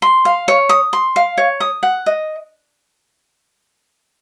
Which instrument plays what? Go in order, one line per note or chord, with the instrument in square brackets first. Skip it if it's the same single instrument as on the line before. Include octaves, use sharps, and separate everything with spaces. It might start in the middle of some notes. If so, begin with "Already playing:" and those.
[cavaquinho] C6
F5
C#5
D#6
C6
F5
C#5
D#6
F#5
D#5